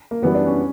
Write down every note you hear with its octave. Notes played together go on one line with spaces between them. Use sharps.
A#3
F#2 E3 G3 B3
D4
C#4